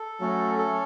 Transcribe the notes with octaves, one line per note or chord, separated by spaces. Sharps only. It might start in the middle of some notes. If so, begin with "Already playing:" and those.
Already playing: A4
F#3 A3 C#4
A4